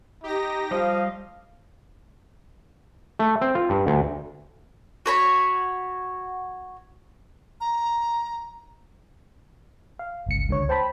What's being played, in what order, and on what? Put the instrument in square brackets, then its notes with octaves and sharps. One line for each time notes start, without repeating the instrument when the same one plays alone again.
[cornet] D#4 [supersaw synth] G4 A#6
[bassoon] F3 [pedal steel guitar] G3 D#5 [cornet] F5
[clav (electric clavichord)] A3
C4
F4
G2
D2
[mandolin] F#4 C#5 B5
[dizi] A#5
[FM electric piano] F5
G1 C#2 C#7
C#2 D3 C#5
C5 G5 A5 B5